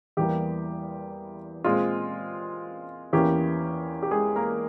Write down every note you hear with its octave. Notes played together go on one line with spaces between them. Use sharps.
E2 E3 G3 A#3 G4
A#2 G#3 C4 F4
E2 E3 A#3 C#4 G4
G4
G#3 G#4
A#3 A#4